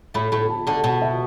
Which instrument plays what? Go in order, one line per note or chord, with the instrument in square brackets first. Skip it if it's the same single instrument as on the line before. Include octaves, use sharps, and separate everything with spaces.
[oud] A2 A3 [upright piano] B5
[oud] A2 A3 [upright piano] B5
[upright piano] A5
[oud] D2 D3 [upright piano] A5
[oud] B2 [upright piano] F#5
[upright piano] E5